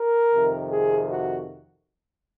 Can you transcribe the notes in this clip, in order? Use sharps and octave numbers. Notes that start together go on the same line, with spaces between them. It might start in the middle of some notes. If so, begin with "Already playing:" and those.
Already playing: A#4
F2 C3 D#3
G#4
F#4